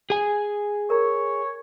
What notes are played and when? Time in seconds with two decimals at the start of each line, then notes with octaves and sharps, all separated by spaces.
0.10 G#4 G#5
0.90 A#4 C#5 A#5